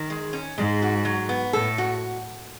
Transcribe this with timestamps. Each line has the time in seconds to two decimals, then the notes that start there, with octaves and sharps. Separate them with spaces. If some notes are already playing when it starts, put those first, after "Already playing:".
Already playing: D#3
0.10 G#3
0.33 C#4
0.58 G#2 G#3
0.82 F#4
1.05 F#3
1.29 B3
1.53 A2 A4
1.78 F#4